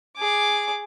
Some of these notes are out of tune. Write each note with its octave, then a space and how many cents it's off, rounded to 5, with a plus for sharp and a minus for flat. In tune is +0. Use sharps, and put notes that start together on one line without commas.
G#4 +0 D6 +0